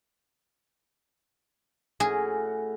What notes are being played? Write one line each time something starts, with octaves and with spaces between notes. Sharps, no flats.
A2 C#4 F#4 G#4